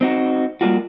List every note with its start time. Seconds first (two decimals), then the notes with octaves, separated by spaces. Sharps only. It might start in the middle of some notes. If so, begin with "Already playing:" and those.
0.01 C4 D#4 F#4
0.61 G3 A#3 D4 F4 F#4